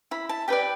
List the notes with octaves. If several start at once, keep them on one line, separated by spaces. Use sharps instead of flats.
E4 B5
A5
G4 B4 D5 G5